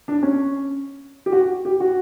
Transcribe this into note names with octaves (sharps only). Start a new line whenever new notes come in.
D4
C#4
G4
F#4
G4
F#4